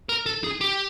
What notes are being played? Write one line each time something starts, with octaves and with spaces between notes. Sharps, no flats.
A#4
A4
G#4
G4